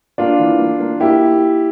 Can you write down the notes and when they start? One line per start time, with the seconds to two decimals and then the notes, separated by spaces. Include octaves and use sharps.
0.18 A#3 D4 F4
0.39 E3
0.59 A#3
0.80 A#3
1.00 A#3 E4 G4